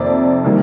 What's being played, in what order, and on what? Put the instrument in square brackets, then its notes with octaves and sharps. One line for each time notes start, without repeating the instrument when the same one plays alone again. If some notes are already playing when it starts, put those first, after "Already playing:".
Already playing: [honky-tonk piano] F2 C3 D#3 A#3 D5
D#3 G3 A#3